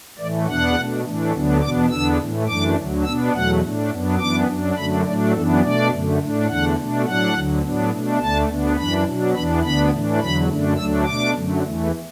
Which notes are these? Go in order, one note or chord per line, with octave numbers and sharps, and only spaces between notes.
A2 E3 A3 D5
E2 B2 B3 D4 F#5
B2 A3 D4
A2 E3 A3 D4
D2 D3 F#3 B3 D4
E2 B2 B3 D4 D6
E2 D3 B3 D4 E6
A2 E3 A3
F#2 E3 A3 D4 D6
D2 D3 F#3
B2 B3 D4 E6
E2 B2 F#3 A3 F#5
A2 A3 D4
F#2 F#3 B3 D4
F#2 E3 B3 D4 D6
F#2 F#3 D4
F#2 D3 F#3 A3 D4 B5
A2 F#3 A3 D4 D5
F#2 E3 B3 D4 A4
B2 A3 D4 D5
F#2 D3 A3
A2 A3 D4
E2 D3 A3 D4 F#5
B2 A3 D4
A2 F#3 D4 F#5
D2 D3 F#3
A2 F#3 B3 D4
B2 A3 D4
D2 D3 A3 D4 A5
D2 D3 B3 D4
F#2 E3 D4 B5
B2 F#3 D4
E2 E3 B3 D4 B5
D2 D3 B3 D4 B5
A2 E3 A3 D4
E2 D3 F#3 B5
F#2 D3 A3 D4
D2 D3 F#3 A3 D4 E6
B2 A3 D4 D6
F#2 D3 F#3 A3
E2 E3 A3